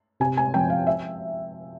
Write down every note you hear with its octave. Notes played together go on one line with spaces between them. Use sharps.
C3 G#5
G#5
F3 C4 G5
F5
E5